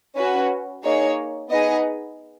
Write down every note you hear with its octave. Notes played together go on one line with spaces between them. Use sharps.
C#4 F#4 B4
A#3 D#4 G#4 C#5
B3 D#4 G#4 D#5